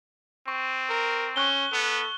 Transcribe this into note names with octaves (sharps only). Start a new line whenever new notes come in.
C4 C#6
A#4
C#4 C#6 F#6 G7
B3 A4